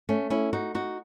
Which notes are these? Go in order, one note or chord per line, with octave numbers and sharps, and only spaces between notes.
A3 C#4
C#4 E4
D#4 F#4
D#4 F#4